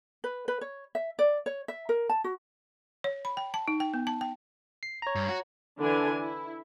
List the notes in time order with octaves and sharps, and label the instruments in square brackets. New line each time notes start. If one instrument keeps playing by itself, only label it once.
[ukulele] B4
B4
C#5
E5
D5
C#5
E5
A#4
A5
F#4
[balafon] C#5
B5
G5
A5
D#4
G5
B3
A5
G5
[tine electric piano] C7
C#5 A#5
[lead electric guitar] G2
F#4
[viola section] D3 E3 D4 G#5
E4